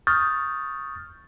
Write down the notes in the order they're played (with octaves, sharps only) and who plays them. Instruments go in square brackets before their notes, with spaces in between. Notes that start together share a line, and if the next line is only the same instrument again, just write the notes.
[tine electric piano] C#6 D#6 F6 G6 A6